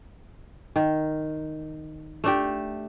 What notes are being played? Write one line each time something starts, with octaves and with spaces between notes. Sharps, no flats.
D#3
A3 D4 G4